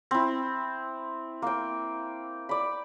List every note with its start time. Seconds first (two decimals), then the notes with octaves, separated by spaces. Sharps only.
0.11 C4 E4
1.42 A#3 G5
2.49 D5 B5